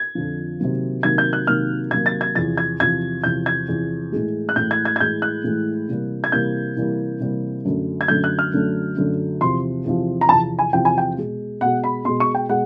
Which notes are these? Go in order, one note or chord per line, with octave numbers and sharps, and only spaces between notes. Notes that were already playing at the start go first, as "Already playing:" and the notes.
Already playing: G#6
F2 D3 F3
C3 D#3 F#3 A#3
C3 D#3 F#3 A#3 G#6
G6
F#6
C3 D#3 F#3 A#3 F6
C3 D#3 F#3 A#3 G#6
A6
G#6
E2 C3 F3 A6
G#6
E2 C3 F3 G#6
E2 C3 F3 G6
G#6
E2 C3 F3
A2 E3 G#3
F#6
A2 E3 G#3 G6
G#6
G#6
G#6
A2 E3 G#3 G6
F#6
A2 E3 G#3
C3 E3 G3 A#3
G#6
C3 E3 G3 A#3 G6
C3 E3 G3 A#3
C3 E3 G3 A#3
F#2 D3 F#3 A3
G#6
F#2 D3 F#3 A3 G6
F#6
F6
F#2 D3 F#3 A3
F#2 D3 F#3 A3
E2 C3 F3 C6
E2 C3 F3
A#5
E2 C3 F3 A5
G#5
E2 C3 F3 G5
G#5
G5
B2 G#3
B2 G#3 F#5
B5
B2 G#3 C6
C#6
G5
B2 G#3 F#5